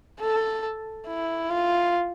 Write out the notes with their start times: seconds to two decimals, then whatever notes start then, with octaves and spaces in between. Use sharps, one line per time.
0.20 A4
1.07 E4
1.50 F4